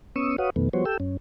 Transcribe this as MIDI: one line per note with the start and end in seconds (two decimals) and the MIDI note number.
0.16 0.36 59
0.16 0.36 61
0.16 0.36 85
0.16 0.36 87
0.16 0.36 88
0.38 0.50 66
0.38 0.50 71
0.38 0.50 73
0.38 0.50 77
0.38 0.50 78
0.38 0.50 87
0.56 0.69 41
0.56 0.69 47
0.56 0.69 51
0.56 0.69 57
0.56 0.69 59
0.73 0.85 53
0.73 0.85 55
0.73 0.85 59
0.73 0.85 66
0.73 0.85 72
0.73 0.85 73
0.86 0.97 67
0.86 0.97 69
0.86 0.97 79
0.86 0.97 88
1.00 1.17 42
1.00 1.17 61